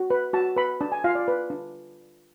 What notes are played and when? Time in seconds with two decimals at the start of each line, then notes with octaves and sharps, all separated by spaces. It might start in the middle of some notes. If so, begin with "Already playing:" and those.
Already playing: F#4
0.10 B4
0.33 F#4 A5
0.56 B4 B5
0.81 D4 A5
0.92 G#5
1.04 F4 F5
1.15 D5
1.28 B4
1.50 D4